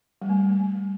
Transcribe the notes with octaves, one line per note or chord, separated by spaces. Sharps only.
G3
A3
G3
A3
A3
G3